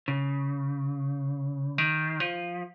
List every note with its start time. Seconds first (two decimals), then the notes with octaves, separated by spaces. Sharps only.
0.08 C#3
1.78 D#3
2.20 F3